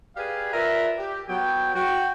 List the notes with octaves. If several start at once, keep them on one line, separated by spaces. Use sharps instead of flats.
G4 G#4 B4 D5 F5
F4 A#4 B4 D5 E5
G4
F#3 B3 G5
F#4 G5